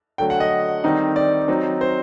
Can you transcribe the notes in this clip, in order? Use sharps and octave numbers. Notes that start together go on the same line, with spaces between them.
D3 F#3 A3 G5
F#5
D#5
D#3 G3 C4 D#4
D5
F#3 C4 D#4
C5